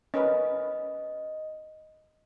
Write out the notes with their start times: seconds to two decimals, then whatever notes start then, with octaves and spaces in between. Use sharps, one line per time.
0.14 C#4 A#4 B4 D#5